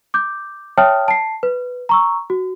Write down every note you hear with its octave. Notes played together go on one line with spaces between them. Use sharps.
D6 G6
C#5 E5 G5 A5 D#6 F6
A5 C7
B4
A#5 C#6 E6
F#4